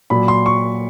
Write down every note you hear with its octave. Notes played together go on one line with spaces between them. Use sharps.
A#2 F#3 B5
C6
C#6